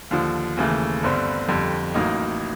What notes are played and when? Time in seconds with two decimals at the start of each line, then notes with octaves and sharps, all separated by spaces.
0.11 D#2 D3 F3
0.57 D#2 C#3 E3 A3
1.03 G1 G2 D3 G3 C4
1.48 F2 D3 G3
1.94 A1 A2 F#3 A#3 D#4